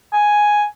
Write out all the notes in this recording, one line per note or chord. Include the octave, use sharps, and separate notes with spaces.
G#5